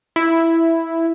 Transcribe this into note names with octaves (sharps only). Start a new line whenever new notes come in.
E4